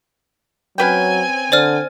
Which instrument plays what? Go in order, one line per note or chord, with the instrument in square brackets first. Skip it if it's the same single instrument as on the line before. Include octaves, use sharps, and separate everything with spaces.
[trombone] F#3 [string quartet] C4 G#5 [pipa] C#4 B4 G5
[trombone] D3 [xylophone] C5 D5 F6